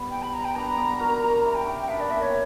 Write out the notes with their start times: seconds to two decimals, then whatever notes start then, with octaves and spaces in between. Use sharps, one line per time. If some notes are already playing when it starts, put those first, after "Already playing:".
Already playing: G3 B3
0.11 G5
0.22 B5
0.34 A#5
0.45 G5
0.56 B3 D4 A#5
0.77 B3 D4
1.00 F#4 A#4
1.22 F#4 A#4
1.44 E4 G4 A#5
1.55 G5
1.66 C#4 E4 G5
1.78 G5
1.89 B3 D4 E5
2.00 D5
2.10 A#3 C#4 E5
2.22 C#5